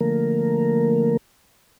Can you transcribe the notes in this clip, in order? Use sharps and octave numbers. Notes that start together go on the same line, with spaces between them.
D3 F3 A3 A#3 A#4